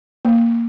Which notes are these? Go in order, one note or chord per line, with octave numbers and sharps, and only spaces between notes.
A#3